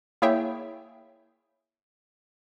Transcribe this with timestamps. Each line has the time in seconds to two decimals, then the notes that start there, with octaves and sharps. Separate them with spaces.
0.22 A#3 E4 G#4 C#5 E5 G5